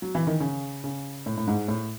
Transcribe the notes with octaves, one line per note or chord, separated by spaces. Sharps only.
F#3
E3
D#3
C#3
C#3
A2
A2
G#2
A2